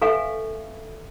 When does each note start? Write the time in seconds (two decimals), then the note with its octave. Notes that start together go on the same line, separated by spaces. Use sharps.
0.02 A4 B4 E5 F5 G#5 C#6